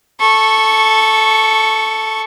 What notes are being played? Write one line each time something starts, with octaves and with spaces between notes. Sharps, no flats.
A4 C#6